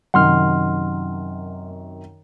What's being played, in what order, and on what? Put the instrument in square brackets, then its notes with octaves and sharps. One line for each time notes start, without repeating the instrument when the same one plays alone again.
[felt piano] F#2 C3 D#3 [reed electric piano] F#5 C6 F6